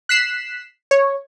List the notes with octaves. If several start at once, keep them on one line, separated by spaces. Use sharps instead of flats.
F#6 B6 C7 E7
C#5